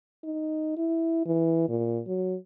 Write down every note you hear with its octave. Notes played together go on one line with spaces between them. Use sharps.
D#4
E4
E3
A#2
F#3